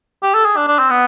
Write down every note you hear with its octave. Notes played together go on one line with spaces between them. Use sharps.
G4
A4
G#4
D4
D4
C4
B3